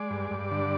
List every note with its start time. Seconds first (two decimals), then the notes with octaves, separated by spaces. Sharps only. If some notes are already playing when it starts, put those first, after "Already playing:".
Already playing: G#3 D5
0.10 G2
0.31 G2
0.51 D3